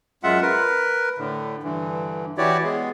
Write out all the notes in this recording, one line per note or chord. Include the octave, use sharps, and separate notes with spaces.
F#2 G#3 F4 E5 F#5
A#4 B4
A2 D3
G2 D3 E3
E3 E4 F#4 G4 C#5 D5
G#3 B3 G#4